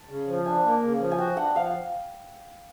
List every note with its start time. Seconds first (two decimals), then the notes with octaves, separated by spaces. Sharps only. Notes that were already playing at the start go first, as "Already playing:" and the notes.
Already playing: A5
0.09 C#3
0.28 F3
0.46 D4 G#5
0.64 A#3
0.82 C#3
1.00 F3
1.11 G#5
1.18 F#4 G5
1.37 D4 F#5
1.55 F3 F5